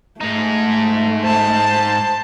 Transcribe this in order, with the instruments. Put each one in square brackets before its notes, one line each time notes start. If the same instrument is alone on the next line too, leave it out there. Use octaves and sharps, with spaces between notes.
[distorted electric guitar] G#2 D#4 [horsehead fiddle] A3
[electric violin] C5 A5